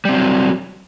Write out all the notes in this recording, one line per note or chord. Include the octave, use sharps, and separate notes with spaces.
F#3 G3 C4